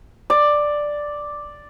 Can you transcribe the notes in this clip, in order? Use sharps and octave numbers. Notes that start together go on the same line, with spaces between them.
D5